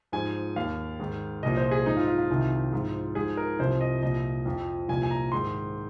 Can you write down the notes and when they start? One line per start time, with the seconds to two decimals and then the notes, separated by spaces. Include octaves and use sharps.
0.12 G#2 F3 G#5
0.56 D#2 D#3 F5
1.00 G#2 D#3
1.43 C2 A#2 F3 D#5
1.57 C5
1.71 G#4
1.86 G#2 F3 D#4
1.97 F4
2.08 F4
2.18 F4
2.30 C2 C3 D#3
2.73 G#2 F3
3.15 G#2 F3 G#4
3.37 A#4
3.59 C2 C3 F3 C5
3.81 D#5
4.02 C2 A#2 F3 D#5
4.46 F2 F3
4.88 C2 A#2 F3 G#5
5.03 G#5
5.11 A#5
5.32 G#2 D#3 C6